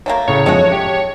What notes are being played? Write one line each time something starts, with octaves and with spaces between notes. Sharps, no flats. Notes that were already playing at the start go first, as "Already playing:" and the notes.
F#3 A3 A#3
A2 C#3 C#5
F2 G#3 A3 D4 F#4
G4